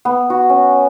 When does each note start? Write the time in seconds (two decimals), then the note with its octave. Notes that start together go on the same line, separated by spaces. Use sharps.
0.05 B3
0.30 F#4
0.50 C#4